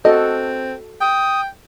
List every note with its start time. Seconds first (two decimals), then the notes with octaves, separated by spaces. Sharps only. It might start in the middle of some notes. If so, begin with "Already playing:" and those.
0.05 C4 F#4 A4 D#5
1.01 G5 D#6